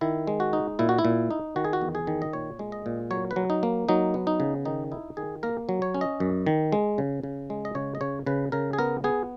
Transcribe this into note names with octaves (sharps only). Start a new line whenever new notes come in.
D#3 E4
G#3
F#4
D#4
A#2 E4
F#4
E4
A#2
D#4
D#3 F#4
G#4
F#4
E2
G#4
D#3
D#5
A#2 C#5
G#3
D#5
A#2
F#3 C#5
B4
F#3
D#4
A#3
F#3 D#4
B3
D#4
C#3
D#3 D#4
D#4 E4
D#3 G#4
A#3 A#4
F#3
C#5
C#4
D#5
F#2
D#3
G#3
C#3
C#3
G#3
D#5
C#3 C#5
D#5
C#3 C#5
C#3 B4
C#3 A#4
G#4
B3 A#4
B3 G#4